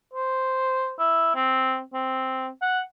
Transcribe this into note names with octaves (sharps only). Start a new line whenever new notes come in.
C5
E4
C4
C4
F#5